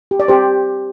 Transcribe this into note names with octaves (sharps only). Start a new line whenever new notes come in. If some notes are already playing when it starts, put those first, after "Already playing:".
G4
D5
C4 G4 C5